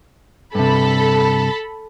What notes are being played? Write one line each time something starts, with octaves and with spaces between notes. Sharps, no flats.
G2 C3 A4 B5